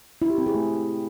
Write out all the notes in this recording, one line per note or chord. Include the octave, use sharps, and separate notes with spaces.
E4
G4
C4
G#4
A3